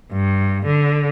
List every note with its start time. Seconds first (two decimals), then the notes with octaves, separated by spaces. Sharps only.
0.12 G2
0.65 D3